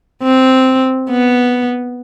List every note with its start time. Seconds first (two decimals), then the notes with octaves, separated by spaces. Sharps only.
0.23 C4
1.10 B3